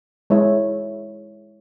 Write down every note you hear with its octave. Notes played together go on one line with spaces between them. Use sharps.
G#3 E4 C#5 E5